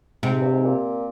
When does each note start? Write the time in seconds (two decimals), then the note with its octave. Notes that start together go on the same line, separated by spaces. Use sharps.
0.23 G#2 C3
0.42 G2
0.53 G#2
0.65 A#2